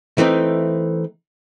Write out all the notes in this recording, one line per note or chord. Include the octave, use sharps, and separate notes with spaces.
E3 A3 C4 D#4